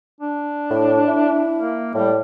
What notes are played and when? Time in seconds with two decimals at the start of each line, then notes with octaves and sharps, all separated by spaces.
0.21 D4
0.71 A2
1.08 E4
1.58 A#3
1.94 A2 G3